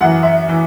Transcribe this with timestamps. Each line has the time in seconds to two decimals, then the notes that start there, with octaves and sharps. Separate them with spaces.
0.01 F#2 E3 F#5
0.23 E5
0.49 E3